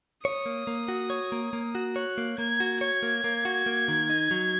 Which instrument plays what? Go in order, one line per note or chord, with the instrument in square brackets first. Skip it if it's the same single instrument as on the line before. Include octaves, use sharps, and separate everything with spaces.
[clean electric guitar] C#5 [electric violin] D#6
[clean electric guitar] A#3
A#3
F#4
C#5
A#3
A#3
F#4
[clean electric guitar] C#5 [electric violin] F#6
[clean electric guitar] A#3
[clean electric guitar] A#3 [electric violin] G#6
[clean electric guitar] F#4
[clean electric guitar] C#5 [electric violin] G#6
[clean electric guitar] A#3
A#3
F#4
A#3
D#3
D#4
F#3